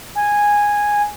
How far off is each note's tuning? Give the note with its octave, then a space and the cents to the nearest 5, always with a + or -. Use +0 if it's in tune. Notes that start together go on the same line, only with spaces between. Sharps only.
G#5 -10